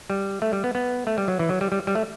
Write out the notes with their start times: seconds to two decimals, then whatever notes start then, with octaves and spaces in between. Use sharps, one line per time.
0.10 G3
0.42 A3
0.53 G3
0.64 B3
0.75 B3
1.07 A3
1.18 G3
1.28 F#3
1.39 E3
1.49 F#3
1.61 G3
1.72 G3
1.87 G3
1.95 A3